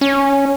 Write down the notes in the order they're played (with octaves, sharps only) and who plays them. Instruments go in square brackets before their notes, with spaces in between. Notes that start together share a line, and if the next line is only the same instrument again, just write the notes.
[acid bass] C#4